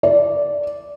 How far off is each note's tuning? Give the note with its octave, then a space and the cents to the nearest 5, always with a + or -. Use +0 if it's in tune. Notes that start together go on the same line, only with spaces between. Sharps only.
D5 -10